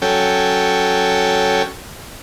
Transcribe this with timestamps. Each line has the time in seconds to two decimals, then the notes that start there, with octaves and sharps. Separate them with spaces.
0.02 F#3 C#4 A4 G5